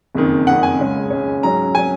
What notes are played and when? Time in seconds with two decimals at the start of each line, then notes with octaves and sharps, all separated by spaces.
0.15 F#1 F2 D#3
0.47 F#1 F2 D#3 F#5
0.63 G#5
0.79 C#2 C#3 G#3 C#4
1.10 C#2 C#3 G#3 C#4
1.43 G#2 F#3 C#4 A#5
1.75 F#3 C#4 G#5